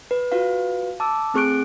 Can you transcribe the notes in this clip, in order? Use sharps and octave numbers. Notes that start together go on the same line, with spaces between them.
B4
F4 F#4 B4 F5
A5 D6 E6
A3 C4 G#4 C#6 F#6 D7